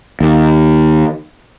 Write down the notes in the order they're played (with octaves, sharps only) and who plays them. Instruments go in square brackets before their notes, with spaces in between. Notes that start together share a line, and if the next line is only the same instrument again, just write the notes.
[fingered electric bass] D#2